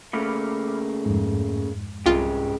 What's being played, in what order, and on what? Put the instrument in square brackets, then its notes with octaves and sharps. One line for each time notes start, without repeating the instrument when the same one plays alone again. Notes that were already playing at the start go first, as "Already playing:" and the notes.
[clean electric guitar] C#3 A3 A#3 [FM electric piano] B5 D6 F6
[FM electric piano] F2 G#2
[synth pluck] C2 F4 [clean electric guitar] C#3 G#3 G4